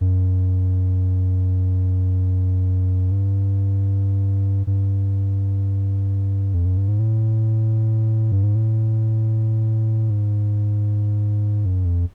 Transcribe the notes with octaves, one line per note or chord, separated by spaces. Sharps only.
F#2
G2
G2
F2
F#2
G2
G#2
A2
G2
G#2
A2
G#2
F#2
F2